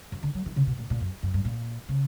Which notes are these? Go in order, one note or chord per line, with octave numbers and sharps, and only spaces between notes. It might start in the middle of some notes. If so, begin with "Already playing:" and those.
F#2
D3
F#3
E3
C#3
B2
A#2
A#2
F#2
F#2
G2
A#2
C#3